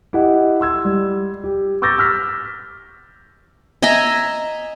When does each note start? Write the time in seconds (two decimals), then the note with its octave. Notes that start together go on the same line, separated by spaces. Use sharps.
0.13 E4 G4 D#5 F#5
0.61 C6 E6 G#6
0.85 G3
1.44 G4
1.82 C#6 D6 E6 G6 A6 A#6
1.98 E6 F6 B6
3.82 D#5 E5 G#5 A#5